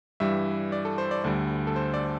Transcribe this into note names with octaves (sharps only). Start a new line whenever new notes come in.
G2 E3 G3 E5
D5
A4
C5
D5
D2 D3 G3 D5
A4
C5
D5